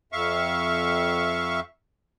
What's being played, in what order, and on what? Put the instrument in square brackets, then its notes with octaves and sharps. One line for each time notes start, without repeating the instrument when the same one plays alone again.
[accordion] F2 E5 F5 C#6